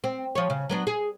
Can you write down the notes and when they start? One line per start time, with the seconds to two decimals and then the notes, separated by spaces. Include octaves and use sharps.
0.04 C4
0.35 F3 C#5
0.50 C#3
0.69 F#3 B3 D4
0.87 G#4